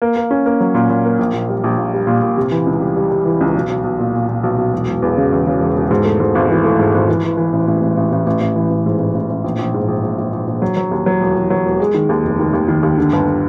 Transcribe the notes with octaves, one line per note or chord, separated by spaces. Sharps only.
A#3
A#3
C#4
A#3
F#3
A#2
A#2
A#3
A#1
A#1
G3
A#1
A#2
G3
A#2
A#2
C3
E3
C#2
G3
G3
G3
E3
C#2
B1
B1
B1
A#2
A#2
A#2
B1
B1
E1
E1
E2
C#3
E2
C#3
E1
E1
G#2
A3
G#2
G#1
E3
A3
G#2
G#1
E3
E3
E3
A1
A1
A1
A1
A1
A1
A1
E3
A1
G#2
A1
A1
A1
A#1
A#1
G#2
A#1
A#1
A#1
A#1
A#1
F#3
F#3
D#2
F#3
E1
E1
F#3
E1
G#3
D#3
D#2
F1
D#3
D#2
D#3
D#2
D3
G1